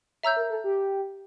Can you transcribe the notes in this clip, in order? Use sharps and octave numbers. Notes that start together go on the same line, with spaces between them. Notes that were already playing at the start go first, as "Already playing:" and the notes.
C#5 E5 A#5 E6 G6
A#4
A4
G4